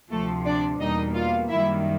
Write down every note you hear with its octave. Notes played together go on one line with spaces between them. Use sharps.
D2 C3 F3 A3 A4
D4 D5
E2 B2 G3 A#3 D#4 D#5
F4 F5
F#2 D#3 G3 A#3 E4 E5